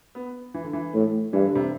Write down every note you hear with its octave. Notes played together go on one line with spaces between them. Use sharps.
B3
E3
D3
E3
A2
G2 E3
D3
C3